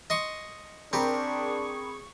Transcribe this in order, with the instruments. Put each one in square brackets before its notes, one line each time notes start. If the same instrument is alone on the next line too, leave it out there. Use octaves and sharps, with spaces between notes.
[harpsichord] D#5 C6 C#6
[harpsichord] C4 G4 [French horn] D4 [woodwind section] G#4 C#6 [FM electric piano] A#4 B5